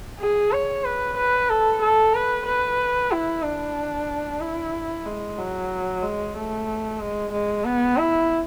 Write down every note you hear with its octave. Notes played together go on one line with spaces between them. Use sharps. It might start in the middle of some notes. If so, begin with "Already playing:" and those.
G#4
C#5
B4
B4
A4
A4
B4
B4
E4
D4
E4
G#3
F#3
G#3
A3
G#3
G#3
B3
E4